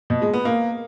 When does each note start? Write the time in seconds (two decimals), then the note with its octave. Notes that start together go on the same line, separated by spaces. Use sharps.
0.10 B2
0.22 G#3
0.33 B3
0.45 A#3